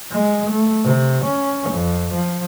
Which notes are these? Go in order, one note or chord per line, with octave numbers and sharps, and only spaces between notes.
G#3
A3
C3
C#4
F2
F3